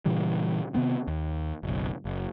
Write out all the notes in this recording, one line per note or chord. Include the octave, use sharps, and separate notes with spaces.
A#2 C#3 E3 G3
C3 D#3 B3 C4
D#2
F#1 B1
F#1